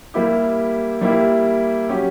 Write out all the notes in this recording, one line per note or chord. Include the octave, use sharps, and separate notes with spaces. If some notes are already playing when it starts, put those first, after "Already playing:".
G3 A#3 E4 G4
G3 A#3 E4 G4
F#3 C#4 G4